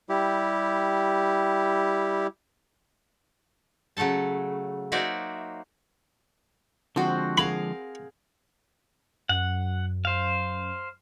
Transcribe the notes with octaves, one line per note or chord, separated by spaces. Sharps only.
G3 E4 G4
C#3 F#3 A3 A4 A5
A#3 D#4 F#4 C5 D5 E5
D3 F3 G#3 C4 F#4
G#4 A#4 F5 B5
F#2 F#5
C5 F5